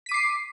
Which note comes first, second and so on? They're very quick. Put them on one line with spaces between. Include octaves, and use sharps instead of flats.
B6 D#7 D6 C7